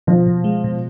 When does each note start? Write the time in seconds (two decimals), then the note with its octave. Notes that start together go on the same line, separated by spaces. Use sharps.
0.07 B2 F3
0.27 B2
0.44 G#3
0.64 B2